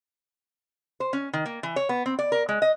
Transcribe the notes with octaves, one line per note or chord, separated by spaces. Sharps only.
C5
C#4
D#3
A#3
E3
C#5
B3
C4
D5
A#4
G#3
D#5